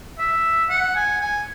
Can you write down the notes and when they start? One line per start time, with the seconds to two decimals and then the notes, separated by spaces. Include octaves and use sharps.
0.18 E5
0.70 F#5
0.96 G#5
1.21 G#5